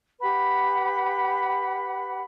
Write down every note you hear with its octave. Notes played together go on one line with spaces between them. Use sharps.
G4 B4 F#5 B5